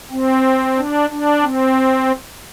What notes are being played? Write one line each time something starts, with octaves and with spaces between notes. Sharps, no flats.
C4
D4
D4
C4